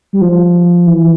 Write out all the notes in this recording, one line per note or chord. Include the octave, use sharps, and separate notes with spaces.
G3
F3
E3